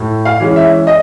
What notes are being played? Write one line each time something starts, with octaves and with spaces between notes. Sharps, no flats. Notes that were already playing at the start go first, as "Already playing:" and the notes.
Already playing: A2
F5
E3 G#3 C#4
E5
D#5